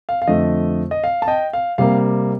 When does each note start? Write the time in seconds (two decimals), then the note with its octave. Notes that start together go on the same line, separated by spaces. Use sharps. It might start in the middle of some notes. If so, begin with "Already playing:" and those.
0.09 F5
0.22 F5
0.27 F2 D3 A3 D#5
0.91 D#5
1.04 F5
1.22 A5
1.28 D#5 G5
1.53 F5
1.78 C3 G3 A#3 F5